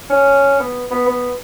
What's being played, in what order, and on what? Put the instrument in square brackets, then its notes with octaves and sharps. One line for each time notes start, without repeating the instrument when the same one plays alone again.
[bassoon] C#4
B3
B3
B3